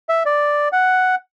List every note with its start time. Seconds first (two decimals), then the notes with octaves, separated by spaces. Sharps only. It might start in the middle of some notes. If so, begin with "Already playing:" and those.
0.09 E5
0.26 D5
0.73 F#5